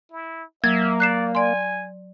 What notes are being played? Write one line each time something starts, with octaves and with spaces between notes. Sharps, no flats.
E4
F#3 A#3 E5 G#6
D5 F#6 C7 E7
D5 G#5 C6